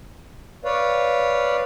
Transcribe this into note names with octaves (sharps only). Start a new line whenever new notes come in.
B4 C#5 D5 F5